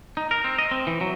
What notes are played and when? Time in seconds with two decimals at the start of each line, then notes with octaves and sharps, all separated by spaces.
0.17 D#4
0.31 A#4
0.44 C4
0.58 D#5
0.71 C4
0.87 E3
1.01 F#3